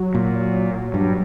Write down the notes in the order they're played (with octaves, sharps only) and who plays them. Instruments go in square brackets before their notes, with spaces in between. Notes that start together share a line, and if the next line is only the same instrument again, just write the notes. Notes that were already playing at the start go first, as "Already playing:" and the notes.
Already playing: [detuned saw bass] F#3
[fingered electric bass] A#2
G2